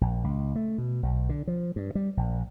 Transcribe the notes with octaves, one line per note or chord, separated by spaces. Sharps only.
A#1
C#2
A3
B2
B1
D3
F3
G2
G3
A#1